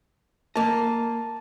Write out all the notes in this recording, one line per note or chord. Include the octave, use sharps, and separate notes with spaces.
A#3 D#5 A5